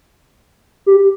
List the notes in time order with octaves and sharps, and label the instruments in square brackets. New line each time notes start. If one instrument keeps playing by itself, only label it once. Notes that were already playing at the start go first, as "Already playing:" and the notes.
[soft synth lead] G4